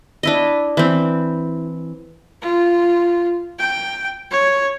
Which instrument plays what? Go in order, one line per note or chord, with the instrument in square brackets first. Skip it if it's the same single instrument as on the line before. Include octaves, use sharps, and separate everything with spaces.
[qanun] D4 E4 D#5
E3 C4
[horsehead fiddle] F4
G5
C#5